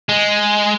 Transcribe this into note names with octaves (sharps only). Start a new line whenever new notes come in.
G#3